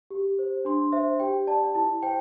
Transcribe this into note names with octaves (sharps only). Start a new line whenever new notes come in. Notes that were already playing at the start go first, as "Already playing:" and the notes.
G4
C5
D4 C6
C5 E5
G4 G5
D5 A5
E4 A5
C5 G5